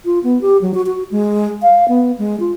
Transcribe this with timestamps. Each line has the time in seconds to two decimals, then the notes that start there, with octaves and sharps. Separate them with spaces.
0.05 F4
0.24 B3
0.41 G4
0.62 F#3
0.74 F#4
0.86 F#4
1.11 G#3
1.62 F5
1.88 B3
2.19 G#3
2.40 F4